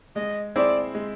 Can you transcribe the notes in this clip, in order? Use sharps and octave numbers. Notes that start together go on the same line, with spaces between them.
G#3 D#5
C4 E4 G#4 C5 D5
G#3